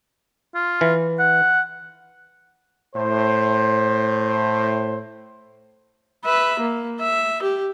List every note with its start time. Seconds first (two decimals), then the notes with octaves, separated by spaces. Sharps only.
0.55 F4
0.81 E3
1.19 F#5
2.95 A2 C5
6.24 B4 E5
6.59 A#3
7.00 E5
7.43 G4